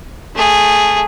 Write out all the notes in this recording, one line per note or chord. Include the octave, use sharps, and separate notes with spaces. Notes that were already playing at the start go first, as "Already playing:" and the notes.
A3 G#4